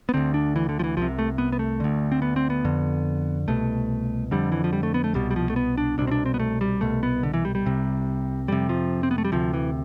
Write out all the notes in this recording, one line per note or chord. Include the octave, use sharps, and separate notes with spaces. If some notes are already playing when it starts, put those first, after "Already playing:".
B3
D2 D3 C4
D4
E3
D3
F3
E3
C2 C3 F3
A3
B3
B3
A3
D2 D3
C4
B3
C4
B3
F2 D3
C2 B2 A3
F2 D3 G3
E3
F3
G3
A3
B3
A3
C2 B2 G3
G3
F3
A3
B3
D4
C2 B2 D4
C4
D4
C4
B3
A3
G3
C2 B2 A3
B3
D3
E3
G3
G3
C2 C3
F2 C3 G3
F3
C4
B3
A3
G3
D2 C3 F3
E3